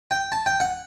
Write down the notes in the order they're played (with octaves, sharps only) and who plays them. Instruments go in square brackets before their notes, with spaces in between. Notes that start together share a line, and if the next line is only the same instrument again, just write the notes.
[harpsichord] G5
A5
G5
F#5